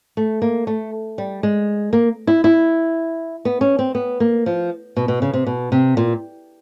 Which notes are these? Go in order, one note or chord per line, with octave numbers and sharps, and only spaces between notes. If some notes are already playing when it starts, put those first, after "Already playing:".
A3
A#3
A3
G3
G#3
A#3
E4
E4
B3
C#4
C4
B3
A#3
F3
B2
B2
C#3
C3
B2
C3
A#2